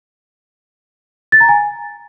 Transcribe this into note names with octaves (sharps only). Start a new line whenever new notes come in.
A6
A#5
G#5